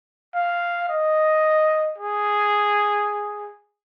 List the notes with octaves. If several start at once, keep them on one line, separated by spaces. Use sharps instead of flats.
F5
D#5
G#4